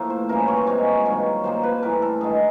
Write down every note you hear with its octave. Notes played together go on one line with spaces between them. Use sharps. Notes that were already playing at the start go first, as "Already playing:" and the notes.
Already playing: A2 F3 A#3
C5
C#3 E3 G3 A#4
C5
C#5
C5
C3 F3 G#3 C#5
G2 D#3 F#3
A#2 F3 A#3 C5
B4
A2 E3 G3 A#4
A4
G2 D#3 G#3 G#4